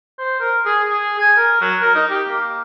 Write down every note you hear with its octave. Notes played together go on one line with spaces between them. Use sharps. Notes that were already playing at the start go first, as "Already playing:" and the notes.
C5
A#4
G#4
G#4
G#5
A#4
F#3
A#4
D#4
G4
A#3